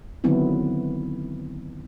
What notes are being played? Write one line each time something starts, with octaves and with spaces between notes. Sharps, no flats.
D3 D#3 F#3 B3 C4 E4